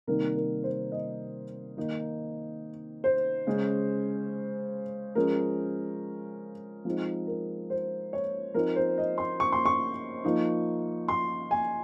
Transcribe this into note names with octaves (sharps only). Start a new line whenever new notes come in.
C3 D#3 G3 A#3 D#4 A#4
A#4
C5
D#5
D#3 A#3 D#4
C5
C#3 G#3 C#4
F3 G#3 C#4 A#4
F3 G#3 C4 D#4
A#4
C5
C#5
F3 C4 D#4 A#4
C5
D#5
C6
C#6
C6
C#6
F3 A#3 D#4
C6
G#5